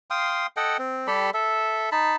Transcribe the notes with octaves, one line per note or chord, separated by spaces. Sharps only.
F5 G5 C6 D#6
A4 D#5 F#5 G5
C4
G3 G4 A4 B5
A4 E5
D#4 A5 B5